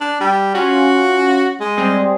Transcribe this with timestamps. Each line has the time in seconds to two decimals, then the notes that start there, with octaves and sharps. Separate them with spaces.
0.01 D4
0.20 G3
0.54 C#4 F4 F#4
1.60 G#3
1.77 G3 C4 G#4